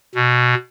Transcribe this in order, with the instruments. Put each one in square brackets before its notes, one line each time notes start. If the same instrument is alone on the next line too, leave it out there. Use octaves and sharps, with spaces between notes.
[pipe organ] B2